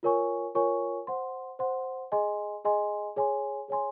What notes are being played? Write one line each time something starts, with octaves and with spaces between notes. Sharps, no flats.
F4 A#4 C#5 G#5 C#6
F4 A#4 C#5 G#5 C#6
C5 F#5 C6
C5 F#5 C6
G#4 D#5 G#5 C6
G#4 D#5 G#5 C6
G#4 C#5 G#5 C6
G#4 C#5 G#5 C6